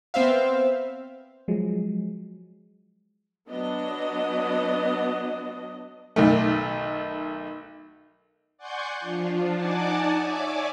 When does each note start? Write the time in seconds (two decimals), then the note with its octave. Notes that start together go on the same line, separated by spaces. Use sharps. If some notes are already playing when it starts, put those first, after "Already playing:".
0.14 B3 C4 C5 E5 F5
1.48 F3 F#3 G#3
3.50 F#3 B3 D4 D#5
6.16 B1 D#3 A3
8.57 D5 F#5 G#5 C6 C#6 G6
9.00 F3 D4 F4
9.54 D#4 D5 F#5 G#5 A5 D6
10.18 C#5 D5 E5 G#5 D6